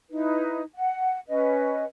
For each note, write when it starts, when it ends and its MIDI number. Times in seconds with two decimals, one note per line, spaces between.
0.10 0.60 63
0.10 0.60 64
0.10 0.60 71
0.75 1.19 78
1.28 1.84 61
1.28 1.84 71
1.28 1.84 75